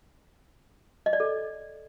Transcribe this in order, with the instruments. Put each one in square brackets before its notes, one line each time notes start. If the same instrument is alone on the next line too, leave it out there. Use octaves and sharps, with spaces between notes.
[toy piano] D#5
D5
A4